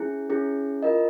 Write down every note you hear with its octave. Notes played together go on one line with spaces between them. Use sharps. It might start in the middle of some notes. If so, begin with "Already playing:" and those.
Already playing: C#4 E4 G#4
C#4 E4 G#4
F4 A#4 D#5